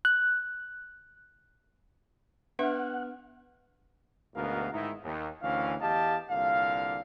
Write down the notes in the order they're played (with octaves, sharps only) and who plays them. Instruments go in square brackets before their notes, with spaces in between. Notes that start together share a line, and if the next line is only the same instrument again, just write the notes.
[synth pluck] F#6
[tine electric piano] B3 F6 [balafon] D4 B4 E5 [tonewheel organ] F#5
[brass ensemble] D2 G#2 B2 B3 A#4 F5
G#2 D#3 D#4 E4
D#2
D2 D#3 E3 C#4 F5
E2 G4 D#5 F5 A5
C2 A#2 D3 F5